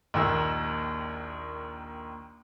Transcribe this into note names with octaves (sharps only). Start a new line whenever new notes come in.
A#1 D#2 D#3 E6